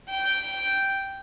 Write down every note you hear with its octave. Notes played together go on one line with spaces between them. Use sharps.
G5